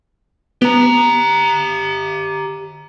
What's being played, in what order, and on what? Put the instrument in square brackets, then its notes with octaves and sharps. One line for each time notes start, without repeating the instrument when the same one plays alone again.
[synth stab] B3 [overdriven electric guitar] G4 A#5